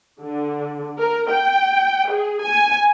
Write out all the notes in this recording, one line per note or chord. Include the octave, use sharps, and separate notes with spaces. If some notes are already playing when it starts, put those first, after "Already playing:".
D3
A#4
G5
G#4
G#5